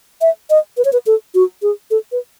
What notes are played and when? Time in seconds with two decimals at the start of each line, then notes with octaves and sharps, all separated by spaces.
0.21 E5
0.50 D#5
0.77 B4
0.85 C#5
0.93 B4
1.06 A4
1.34 F#4
1.62 G#4
1.91 A4
2.12 B4